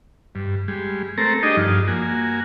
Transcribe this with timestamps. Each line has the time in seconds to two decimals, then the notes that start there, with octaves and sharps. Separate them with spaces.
0.35 G2
0.68 G3 G#3
1.18 A3 C4 A4 A#4 A#5
1.43 D4 D#4 G4 G#4 D#5
1.57 G2 F3
1.88 A#3 F#4 G#5